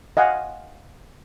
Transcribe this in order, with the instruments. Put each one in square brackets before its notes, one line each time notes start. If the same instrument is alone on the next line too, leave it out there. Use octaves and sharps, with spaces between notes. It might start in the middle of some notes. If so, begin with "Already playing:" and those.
[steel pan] D#5 F5 F#5 G#5